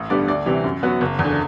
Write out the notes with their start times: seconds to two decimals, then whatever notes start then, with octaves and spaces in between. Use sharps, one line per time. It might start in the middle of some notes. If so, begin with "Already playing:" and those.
Already playing: A1
0.10 G2 D3 G3 B3 D5
0.27 D2 D5
0.46 C3 E3 G3
0.64 F#2
0.83 F#3 B3
1.01 F#1
1.19 E2
1.24 D3